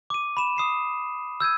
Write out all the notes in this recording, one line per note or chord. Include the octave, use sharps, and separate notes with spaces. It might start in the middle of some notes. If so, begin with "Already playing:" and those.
D6 D#7
B5 E7
D#6 C7 E7
E6 G6 G#6 D#7